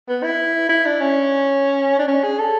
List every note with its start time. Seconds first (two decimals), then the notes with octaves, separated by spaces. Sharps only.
0.09 B3
0.23 E4
0.69 E4
0.86 D4
1.00 C#4
1.99 D4
2.08 C#4
2.24 G#4
2.39 A4